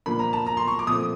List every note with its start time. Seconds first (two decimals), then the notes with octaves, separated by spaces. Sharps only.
0.06 A#2 F3 A#3 D4 B5
0.19 A#5
0.33 A5
0.47 A#5
0.57 C6
0.67 C#6
0.79 D6
0.87 A#2 F3 A3 C4 D#6